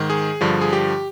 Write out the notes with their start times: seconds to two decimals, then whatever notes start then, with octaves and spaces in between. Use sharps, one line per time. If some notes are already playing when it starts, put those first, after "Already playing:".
Already playing: G#2 D#3
0.10 G#4
0.41 G2 D3 F3
0.61 G#4
0.73 G4